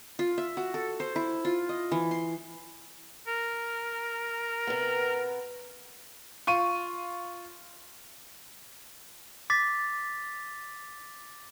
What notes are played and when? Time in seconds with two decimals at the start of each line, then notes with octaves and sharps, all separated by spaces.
0.19 F4
0.38 E5
0.57 F#4
0.74 A4
1.00 C5
1.16 E4
1.45 F4
1.69 D#5
1.91 E3
2.11 C6
3.27 A#4
4.67 C3 B3
6.47 F4 C#6 D#7
9.50 D6 A6 B6